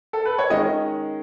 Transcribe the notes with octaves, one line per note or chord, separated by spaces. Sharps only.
A4
B4
C#5
D#3 G#3 C#4 D#5